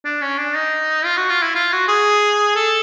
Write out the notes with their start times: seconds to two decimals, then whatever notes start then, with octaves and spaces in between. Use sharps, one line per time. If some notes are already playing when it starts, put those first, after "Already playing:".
0.05 D4
0.22 C#4
0.38 D4
0.55 D#4
1.05 F4
1.17 F#4
1.30 F4
1.42 E4
1.55 F4
1.72 F#4
1.88 G#4
2.56 A4